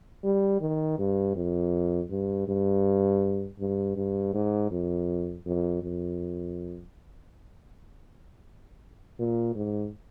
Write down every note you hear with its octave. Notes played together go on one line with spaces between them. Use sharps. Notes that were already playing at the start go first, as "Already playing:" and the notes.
G3
D#3
G2
F2
G2
G2
G2
G2
G#2
F2
F2
F2
A#2
G#2